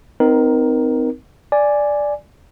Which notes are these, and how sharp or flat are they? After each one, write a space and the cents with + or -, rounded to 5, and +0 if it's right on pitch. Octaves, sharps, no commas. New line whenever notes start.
C4 -30 D#4 +0 A#4 +15
D5 +0 G#5 +0